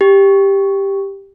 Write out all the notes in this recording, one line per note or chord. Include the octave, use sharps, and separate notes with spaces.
G4